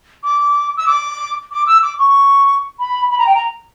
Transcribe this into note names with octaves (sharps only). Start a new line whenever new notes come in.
D6
E6
D6
D6
E6
D6
C#6
B5
B5
A#5
G5
A#5